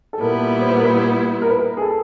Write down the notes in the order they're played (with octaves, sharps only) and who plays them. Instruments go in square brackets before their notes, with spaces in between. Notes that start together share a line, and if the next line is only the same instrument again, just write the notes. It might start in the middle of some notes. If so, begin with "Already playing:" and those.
[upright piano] A4
[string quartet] A#2 G3 B3 E4 [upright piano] A#4
[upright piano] C5
B4
A#4
B4
A#4
B4
A#4
G#4
A4